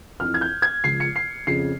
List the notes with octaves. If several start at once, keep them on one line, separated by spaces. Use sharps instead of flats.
F2 E3 F6
G#6
G6
G#6
C#2 C#3 F3 C7
C#7
C7
F2 C#3 F3 C7